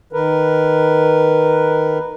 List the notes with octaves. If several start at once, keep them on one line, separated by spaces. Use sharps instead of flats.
D#3 A#4 B4